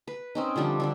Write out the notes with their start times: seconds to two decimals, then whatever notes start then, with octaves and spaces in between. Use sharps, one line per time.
0.08 B4
0.35 C4 C#4 D#4
0.56 D3 F3 G3 D4
0.80 D3 G3 D4